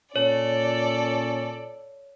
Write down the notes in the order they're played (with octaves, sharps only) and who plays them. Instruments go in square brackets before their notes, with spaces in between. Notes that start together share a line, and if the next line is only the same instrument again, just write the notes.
[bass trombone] A#2 [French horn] C#4 [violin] A4 D5 [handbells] C#5